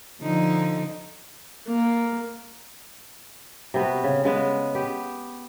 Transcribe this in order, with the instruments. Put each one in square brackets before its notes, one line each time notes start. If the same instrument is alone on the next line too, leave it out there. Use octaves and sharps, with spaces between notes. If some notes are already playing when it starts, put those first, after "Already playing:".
[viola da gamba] D3 F3 D#4
[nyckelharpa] A#3
[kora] C3 B3 F#4
C#3
C#3 G#3 B3
B3 G4